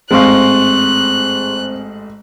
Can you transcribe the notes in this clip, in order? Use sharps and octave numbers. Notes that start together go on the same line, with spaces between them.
A1 G#2 C4 G#4 F5 C6 C#6 F#6